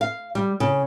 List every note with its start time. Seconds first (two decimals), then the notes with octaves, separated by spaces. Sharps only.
0.01 F5
0.35 G3
0.60 C#3